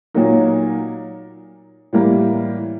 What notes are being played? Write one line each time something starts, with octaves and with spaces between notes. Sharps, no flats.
A#2 F#3 A#3 D#4
A2 E3 G3 A#3